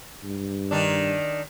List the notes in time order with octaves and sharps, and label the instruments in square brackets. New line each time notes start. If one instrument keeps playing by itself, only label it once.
[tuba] G2
[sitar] D#3 D4